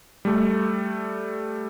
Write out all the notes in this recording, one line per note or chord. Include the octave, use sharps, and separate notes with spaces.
G3 A3